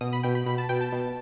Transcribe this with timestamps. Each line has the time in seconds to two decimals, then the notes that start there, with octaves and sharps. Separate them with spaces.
0.01 B2 D#6
0.13 B5
0.23 B2 G5
0.35 B5
0.46 B2 B5
0.58 A5
0.69 B2 G5
0.81 A5
0.92 B2